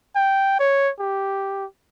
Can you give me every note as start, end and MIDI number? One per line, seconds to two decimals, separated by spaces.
0.16 0.56 79
0.59 0.91 73
1.00 1.65 67